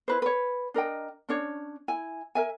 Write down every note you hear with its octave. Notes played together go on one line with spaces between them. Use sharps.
E4 B4 C5
B4 C#5
D4 A#4 D#5 G5
C#4 D4 C#5
E4 G#5
A#4 E5 G#5